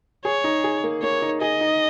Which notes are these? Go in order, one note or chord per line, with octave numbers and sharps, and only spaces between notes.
G#4 C#5
D#4
G#4
A#3
A#3 C#5
D#4
G#4 D#5
D#4